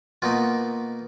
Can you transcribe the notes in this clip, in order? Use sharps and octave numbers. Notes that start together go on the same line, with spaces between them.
B2 A#3 D#4 F4